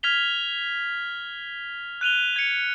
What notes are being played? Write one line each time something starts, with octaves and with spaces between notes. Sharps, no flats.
F6 G#6 B6 F7 G7
F#6 D#7 F7 G7
G#6 C#7